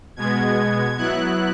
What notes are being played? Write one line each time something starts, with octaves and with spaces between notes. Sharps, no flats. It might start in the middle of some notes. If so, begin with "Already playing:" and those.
B2 G#3 B3 G#6
F#3 B3 E4 F#6